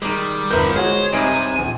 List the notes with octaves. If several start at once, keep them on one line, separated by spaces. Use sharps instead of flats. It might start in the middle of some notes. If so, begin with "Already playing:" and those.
D#3 G3 G#3
G1 F2 F3 A#4 B4 E5 E6 G6
G#3 F#4 G#4 C5 C#5
C2 F#2 C3 G3 D#4 G#5 D7
A#1 D#7